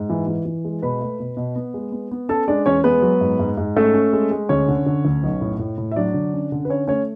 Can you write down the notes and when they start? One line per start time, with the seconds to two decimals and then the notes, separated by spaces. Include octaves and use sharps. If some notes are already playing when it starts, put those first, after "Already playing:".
Already playing: G#2
0.10 E3
0.27 E3
0.45 E3
0.65 G#3
0.82 B2 B4 B5
1.01 A3
1.20 B2
1.37 B2
1.56 B3
1.74 G#3
1.92 B3
2.11 B3
2.29 C#4 A4 A5
2.48 G#3 D4 D5
2.66 E2 C#4 C#5
2.84 G#3 B3 B4
3.02 F#3
3.21 G#2
3.39 G#2
3.57 G#2
3.76 A3 C#4 A4
3.94 C#4
4.13 G#3
4.31 G#3
4.49 D2 C#4 C#5
4.68 D3
4.86 D3
5.05 D2
5.23 B1
5.41 A2
5.59 A2
5.78 A2
5.91 E5
5.96 F#3 D4 D5
6.14 D3
6.34 C#4
6.52 D3
6.65 B4
6.70 C#4 C#5
6.87 A3 C#4 C#5